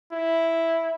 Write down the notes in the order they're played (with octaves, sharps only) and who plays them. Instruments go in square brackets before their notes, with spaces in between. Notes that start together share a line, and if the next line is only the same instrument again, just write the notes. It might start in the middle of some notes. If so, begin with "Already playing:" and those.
[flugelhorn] E4